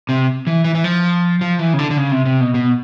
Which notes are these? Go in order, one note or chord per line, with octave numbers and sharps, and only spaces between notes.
C3
E3
E3
E3
F3
F3
E3
C#3
D3
D3
C#3
C3
C3
B2
B2